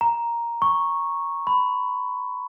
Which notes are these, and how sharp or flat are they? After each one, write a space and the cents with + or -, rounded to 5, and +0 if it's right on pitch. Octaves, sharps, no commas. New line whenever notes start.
A#5 +5
C#6 -5
B5 +20